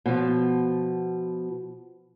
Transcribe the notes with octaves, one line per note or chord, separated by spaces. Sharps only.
B2 F3